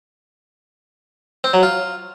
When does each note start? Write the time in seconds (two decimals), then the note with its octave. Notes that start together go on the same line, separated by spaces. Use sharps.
1.44 C4
1.54 F#3
1.63 F4